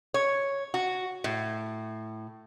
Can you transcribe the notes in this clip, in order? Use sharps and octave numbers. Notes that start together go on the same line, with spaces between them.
C#5
F#4
A2